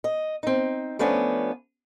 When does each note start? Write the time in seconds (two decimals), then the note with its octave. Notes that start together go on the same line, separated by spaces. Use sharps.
0.04 D#5
0.43 C4 D#4
0.99 F3 A3 B3 C#4 D4